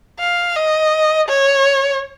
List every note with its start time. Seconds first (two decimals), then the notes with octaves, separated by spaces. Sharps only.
0.19 F5
0.55 D#5
1.28 C#5